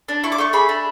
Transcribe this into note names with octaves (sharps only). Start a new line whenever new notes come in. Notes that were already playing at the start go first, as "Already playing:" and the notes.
D4
E4 C#6
D6
A3 C#6
G#4 B5
D4